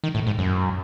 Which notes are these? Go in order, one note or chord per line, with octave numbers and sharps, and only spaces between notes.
D#3
A2
G#2
F#2